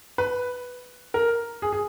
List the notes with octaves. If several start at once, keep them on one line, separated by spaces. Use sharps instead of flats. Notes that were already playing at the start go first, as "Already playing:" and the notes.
B4
A#4
G#4
G#4